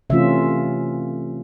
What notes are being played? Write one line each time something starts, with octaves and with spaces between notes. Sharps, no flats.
C3 E3 A3 C#4 F4 E5